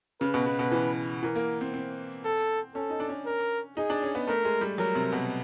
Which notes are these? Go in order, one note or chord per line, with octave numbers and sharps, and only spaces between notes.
C#3 B4
B2
B2
B2
E3
E3 A#4
A#3
C4
C4
A4
C#4 A4
D#4
D4
C#4
A#4
D#4 G#4
D4
C#4
B3
A3 A#4
G#3
G3
F#3 A#4
C3
B2